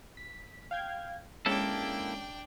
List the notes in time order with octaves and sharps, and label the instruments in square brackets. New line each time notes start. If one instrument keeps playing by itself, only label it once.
[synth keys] B6
F5 G5 G#6
[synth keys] G#3 C#4 [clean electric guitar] A#3 E4 A4 [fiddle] D4 G5